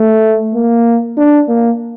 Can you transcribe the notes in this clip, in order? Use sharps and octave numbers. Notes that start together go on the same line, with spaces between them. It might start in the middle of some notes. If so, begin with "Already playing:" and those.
Already playing: A3
A#3
D4
A#3